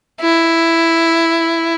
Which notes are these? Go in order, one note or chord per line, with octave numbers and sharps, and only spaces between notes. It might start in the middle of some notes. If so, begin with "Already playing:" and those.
E4